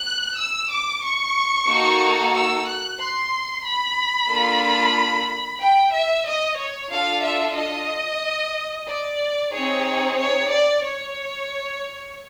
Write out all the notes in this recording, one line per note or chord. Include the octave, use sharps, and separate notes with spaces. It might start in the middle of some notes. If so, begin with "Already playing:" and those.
Already playing: F#6
E6
D6
C#6
A#3 D#4 F#4 A4
E6
F#6
C6
B5
A#3 D4 F4 A4
G5
E5
D#5
C#5
D4 F4 A4 F5
E5
D#5
D5
C4 D#4 G#4 C#5
C#5
D5
C#5